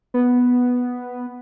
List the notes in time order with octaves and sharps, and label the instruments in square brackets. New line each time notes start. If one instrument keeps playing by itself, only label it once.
[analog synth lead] B3